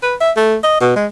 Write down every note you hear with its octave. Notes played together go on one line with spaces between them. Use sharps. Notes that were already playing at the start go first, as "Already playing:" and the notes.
B4
E5
A3
D#5
B2
G#3